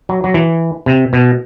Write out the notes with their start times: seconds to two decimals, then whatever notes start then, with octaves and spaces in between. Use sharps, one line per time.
0.09 F#3
0.24 F#3
0.34 E3
0.86 C3
1.13 B2